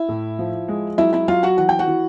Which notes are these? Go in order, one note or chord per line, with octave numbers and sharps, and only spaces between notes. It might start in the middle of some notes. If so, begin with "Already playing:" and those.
Already playing: E4 E5
A2
F3
G#3
F#3 E4 E5
E4 E5
F#3 F4 F5
F#4 F#5
E3 F#5
G5
F#4 F#5
E3